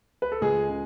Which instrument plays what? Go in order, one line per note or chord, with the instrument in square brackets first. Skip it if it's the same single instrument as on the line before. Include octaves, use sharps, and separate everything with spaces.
[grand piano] B4
A4
C#2 G#3 G#4
C#3